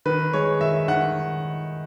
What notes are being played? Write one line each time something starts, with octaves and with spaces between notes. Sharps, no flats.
D#3 B4
G#3 C#5
D#3 E5
D#3 F#5